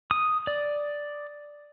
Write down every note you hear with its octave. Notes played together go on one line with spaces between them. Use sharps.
D#6
D5